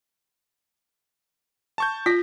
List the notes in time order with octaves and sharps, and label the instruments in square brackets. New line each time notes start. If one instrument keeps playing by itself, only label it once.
[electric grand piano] A5 C#6 G6
[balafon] F4 [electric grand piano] A#6 B6